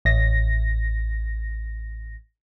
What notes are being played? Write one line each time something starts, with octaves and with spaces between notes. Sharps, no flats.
A1 A#6